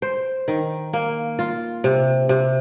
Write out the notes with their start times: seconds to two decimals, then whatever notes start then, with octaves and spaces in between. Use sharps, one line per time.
0.02 C5
0.48 D#3
0.93 A#3
1.39 F4
1.84 C3
2.29 C3